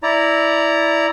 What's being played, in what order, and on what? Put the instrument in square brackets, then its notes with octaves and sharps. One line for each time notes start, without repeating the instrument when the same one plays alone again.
[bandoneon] E4 D5 A#5